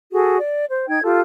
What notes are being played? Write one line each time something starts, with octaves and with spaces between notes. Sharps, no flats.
F#4 G#4 A4
D5
C5
D#4 G5 G#6
F4 G4 A4